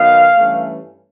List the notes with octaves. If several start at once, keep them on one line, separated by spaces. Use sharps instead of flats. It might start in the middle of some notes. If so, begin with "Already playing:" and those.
Already playing: D#3 F#3 B3 F5
G2 E3 A3 C#4